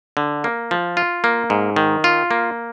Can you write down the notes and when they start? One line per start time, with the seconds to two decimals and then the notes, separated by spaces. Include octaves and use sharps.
0.17 D3
0.44 A#3
0.71 F3
0.97 F4
1.24 A#3
1.50 G#2
1.76 D#3
2.04 F4
2.31 A#3